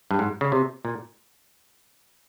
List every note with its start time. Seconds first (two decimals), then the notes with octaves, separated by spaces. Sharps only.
0.11 G2
0.19 G#2
0.41 C#3
0.52 C3
0.85 A#2